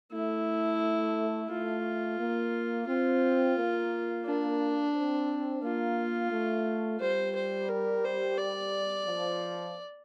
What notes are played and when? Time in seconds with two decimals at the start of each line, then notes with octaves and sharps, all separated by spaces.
0.12 A3 E4
1.50 A3 F4
2.19 A#3
2.87 C4 F4
3.57 A#3
4.25 D4
4.94 C4
5.62 A#3 F4
6.31 A3
7.00 G3 C5
7.35 C5
7.69 A#4
8.04 C5
8.38 D5
9.07 F3